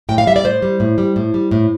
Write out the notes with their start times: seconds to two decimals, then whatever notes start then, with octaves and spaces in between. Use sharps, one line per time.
0.09 A2 G5
0.18 F5
0.27 G3 E5
0.36 D5
0.44 A2 C5
0.62 G3
0.80 A2
0.98 G3
1.16 A2
1.34 G3
1.51 A2